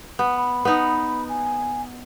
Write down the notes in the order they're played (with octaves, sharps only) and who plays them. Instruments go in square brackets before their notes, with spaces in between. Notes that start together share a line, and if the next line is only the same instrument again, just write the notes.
[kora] B3
[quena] B5
[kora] B3 D#4
[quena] G#5